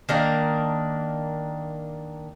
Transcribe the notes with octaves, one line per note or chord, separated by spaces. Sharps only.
D#3 A#3 D4 A#4